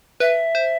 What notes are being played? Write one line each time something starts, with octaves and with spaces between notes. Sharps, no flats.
B4 E5
C5